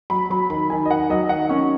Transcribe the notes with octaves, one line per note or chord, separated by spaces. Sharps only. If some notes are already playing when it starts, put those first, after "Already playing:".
F#3 B5
F#3 B5
D#3 B5
D#3 G#5
D#5
D#3 F#5
F#3 D#5
D#3 F#5
C#4 C#6